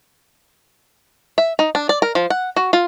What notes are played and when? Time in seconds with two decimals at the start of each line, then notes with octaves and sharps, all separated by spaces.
1.38 E5
1.59 D#4
1.75 D4
1.89 D5
2.02 A#4
2.15 F3
2.30 F#5
2.56 F#4
2.73 F4